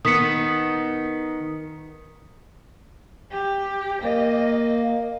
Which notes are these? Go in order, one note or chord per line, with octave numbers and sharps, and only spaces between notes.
D#3 B3 D#6 B6 C#7
G4
A#3 D#5